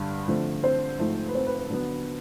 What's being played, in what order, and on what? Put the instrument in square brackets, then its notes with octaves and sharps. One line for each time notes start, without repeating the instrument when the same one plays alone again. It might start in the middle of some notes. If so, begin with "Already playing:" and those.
Already playing: [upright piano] G2 D3 G3
D3 F3 A3 C4
C4 C5
G#2 F3 A3
B4
C4 C5
B4
B4
D3 F#3 B3